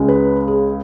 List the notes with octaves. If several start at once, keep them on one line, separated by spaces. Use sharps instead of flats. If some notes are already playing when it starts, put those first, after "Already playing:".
Already playing: C#2 C#3 G#3 C#4
B4
G#4